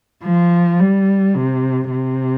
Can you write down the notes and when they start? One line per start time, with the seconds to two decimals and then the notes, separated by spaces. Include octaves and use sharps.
0.23 F3
0.79 G3
1.35 C3
1.91 C3